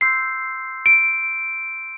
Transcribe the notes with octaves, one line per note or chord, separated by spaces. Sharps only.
C6 E6 G6 C7
D7